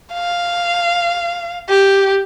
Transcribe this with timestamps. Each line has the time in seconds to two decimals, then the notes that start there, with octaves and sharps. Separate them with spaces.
0.14 F5
1.69 G4